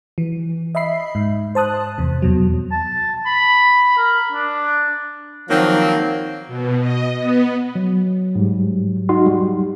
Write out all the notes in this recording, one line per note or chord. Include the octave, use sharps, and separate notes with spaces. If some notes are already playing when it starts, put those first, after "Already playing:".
E3
D#5 E5 B5 C7
G#2
C5 A5 D#6 F#6
E2 C3
E2 B2 F#3
A5
B5
A#4
D4
D#3 F3 F#3 A#3 C4
B2
D#5
B3
F#3
G#2 G3
D#4 F#4 C6
G3